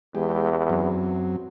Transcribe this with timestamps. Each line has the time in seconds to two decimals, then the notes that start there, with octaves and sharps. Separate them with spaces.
0.15 E2 G#3 G4
0.70 F#2 F#3 C4